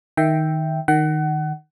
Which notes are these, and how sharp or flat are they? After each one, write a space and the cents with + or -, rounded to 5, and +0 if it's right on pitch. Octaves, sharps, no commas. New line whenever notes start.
D#3 +5 E5 +0 G5 +0
D#3 -10 F#5 +30